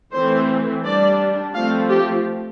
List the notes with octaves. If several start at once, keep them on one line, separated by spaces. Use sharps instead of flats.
E3 A3 C4 C5
G3 D4 D5
F3 A3 C4 F5
G4